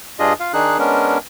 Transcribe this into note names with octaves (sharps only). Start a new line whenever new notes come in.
G2 D4 F4 G#4 D#5
F4 F5
D#3 D4 D#4 G#4 F#6
G#3 B3 C#4 D4 A#4